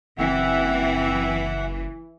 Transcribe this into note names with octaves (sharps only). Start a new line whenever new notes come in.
F#1 E3 C4 E5 F#5